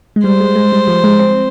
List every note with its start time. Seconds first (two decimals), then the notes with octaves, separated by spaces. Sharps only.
0.16 G#3
0.24 G3 C5
0.40 G#3
0.55 G#3
0.72 G3
0.88 F3
1.04 G#3
1.19 C4